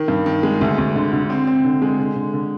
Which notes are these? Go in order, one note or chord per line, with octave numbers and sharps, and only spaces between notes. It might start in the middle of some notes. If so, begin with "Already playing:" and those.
Already playing: D#3
G2
D#3
G#3
D2
D2
D3
D3
C4
C4
D3
G#3
D3
D3
D3